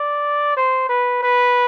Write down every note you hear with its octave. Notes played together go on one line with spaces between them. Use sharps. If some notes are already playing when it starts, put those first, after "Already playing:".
Already playing: D5
C5
B4
B4